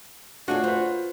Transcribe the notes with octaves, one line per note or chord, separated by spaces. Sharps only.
A3 D4 F4 F#4 G#4 C#5
F4 B4 C5